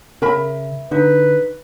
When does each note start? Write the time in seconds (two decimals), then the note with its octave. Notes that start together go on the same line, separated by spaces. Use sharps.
0.22 C#3 A#4 E5 B5
0.91 D3 D#4 B4